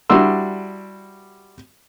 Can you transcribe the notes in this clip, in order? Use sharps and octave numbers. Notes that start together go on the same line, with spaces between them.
G3 D4 E4 F#4 C6 E6